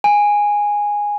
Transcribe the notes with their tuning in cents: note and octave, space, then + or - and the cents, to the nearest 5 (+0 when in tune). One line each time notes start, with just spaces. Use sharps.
G#5 -10